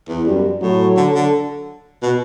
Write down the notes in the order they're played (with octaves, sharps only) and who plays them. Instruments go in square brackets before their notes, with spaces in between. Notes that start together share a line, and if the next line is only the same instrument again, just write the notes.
[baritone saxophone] E2
[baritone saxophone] F#2 [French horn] G3
[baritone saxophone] A2 [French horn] F#3
[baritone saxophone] D3
D3
B2